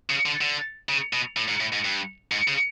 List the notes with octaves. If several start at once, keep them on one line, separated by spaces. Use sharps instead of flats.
C#3
D3
D3
C#3
B2
A2
G#2
A2
G#2
G2
G#2
C#3